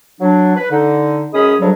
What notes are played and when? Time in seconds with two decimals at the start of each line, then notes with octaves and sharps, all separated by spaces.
0.20 F#3 D4
0.56 B4
0.70 D3 D#4
1.33 F#2 G#3 C#4 G#4 B5 D#6
1.60 D2 C#3 F#3 G3 D4